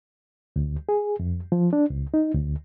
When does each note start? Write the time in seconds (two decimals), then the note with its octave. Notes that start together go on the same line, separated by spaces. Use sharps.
0.56 D2
0.89 G#4
1.19 F2
1.52 F3
1.73 D4
1.90 C#2
2.14 D#4
2.34 D2